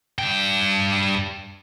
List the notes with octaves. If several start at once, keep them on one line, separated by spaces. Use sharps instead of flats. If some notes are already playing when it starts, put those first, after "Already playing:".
G2 G5